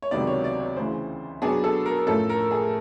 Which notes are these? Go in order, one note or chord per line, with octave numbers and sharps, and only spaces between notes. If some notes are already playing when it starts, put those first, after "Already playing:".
C#5
C#2 C3 D#3 F#3 B3 D5
C#5
D5
C#5
D2 C#3 E3 C5
B2 F#3 B3 D4 G#4
A4
A#4
A2 F3 A3 C#4 A4
A#4
G#4